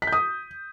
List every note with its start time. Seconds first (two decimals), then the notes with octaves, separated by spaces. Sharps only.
0.02 B6
0.07 G6
0.12 D#6